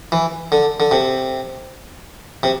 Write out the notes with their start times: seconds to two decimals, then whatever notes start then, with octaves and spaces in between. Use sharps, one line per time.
0.12 E3
0.52 D3
0.80 D3
0.91 C3
2.43 C3